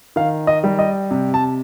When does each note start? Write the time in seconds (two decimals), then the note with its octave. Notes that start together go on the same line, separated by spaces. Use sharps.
0.16 D#3 F5
0.47 D#5
0.64 G3
0.79 D#5
1.11 C3
1.34 A5